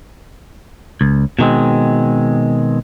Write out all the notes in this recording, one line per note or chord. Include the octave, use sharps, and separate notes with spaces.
C#2
B2 D#3 G#3 C4